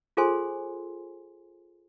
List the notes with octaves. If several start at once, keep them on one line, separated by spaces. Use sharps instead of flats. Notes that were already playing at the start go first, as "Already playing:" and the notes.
F4 G#4 A4 C5 G#5 C6